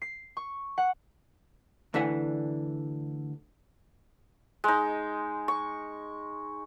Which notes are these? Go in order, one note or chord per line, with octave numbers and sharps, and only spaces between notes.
C7
C#6
F#5
D2 D3 E3 E5 F#5 G#5
G#3 D#4
C#6